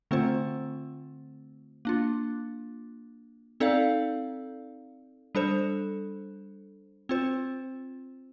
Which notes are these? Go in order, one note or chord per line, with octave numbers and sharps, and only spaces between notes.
D3 A3 C4 F4 C5
A#3 D4 F4
C4 D#4 A4 D5 F5
G3 D4 A4 C5
C4 F4 C5